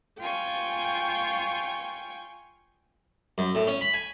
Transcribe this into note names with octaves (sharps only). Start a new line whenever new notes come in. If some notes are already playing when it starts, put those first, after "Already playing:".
F4 G5 G#5 C#6
F#2
A2
C#4
B5
G#5